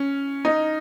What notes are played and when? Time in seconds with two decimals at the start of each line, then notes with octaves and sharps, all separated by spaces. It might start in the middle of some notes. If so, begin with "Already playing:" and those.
Already playing: C#4
0.45 D#4